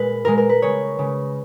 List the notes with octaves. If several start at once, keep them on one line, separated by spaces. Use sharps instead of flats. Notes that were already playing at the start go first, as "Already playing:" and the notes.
Already playing: A#2 G#3 B4
A#2 G#3 A#4
A#4
B4
C#3 G#3 C#5
C#3 G#3